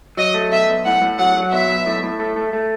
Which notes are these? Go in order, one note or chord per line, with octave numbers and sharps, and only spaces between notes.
F#3 D#5
A3
B1 E5
B1
A2 F#5
A2
F#3 F#5
F#3
B1 E5
B1
A2
A2
A3
A3
A3